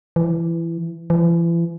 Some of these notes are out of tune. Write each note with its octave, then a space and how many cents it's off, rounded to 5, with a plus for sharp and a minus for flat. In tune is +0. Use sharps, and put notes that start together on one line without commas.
E3 +20
E3 +40